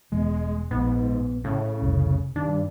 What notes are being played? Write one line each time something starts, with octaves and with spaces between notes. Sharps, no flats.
E1 E3 G#3 B3
A#1 G#2 B3
A2 C#3
F1 C2
G2 D#3 D4